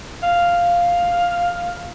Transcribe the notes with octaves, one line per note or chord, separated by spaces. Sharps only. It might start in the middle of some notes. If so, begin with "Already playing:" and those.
F5